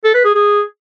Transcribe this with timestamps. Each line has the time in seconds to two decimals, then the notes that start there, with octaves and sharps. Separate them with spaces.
0.04 A4
0.14 B4
0.24 G#4
0.35 G#4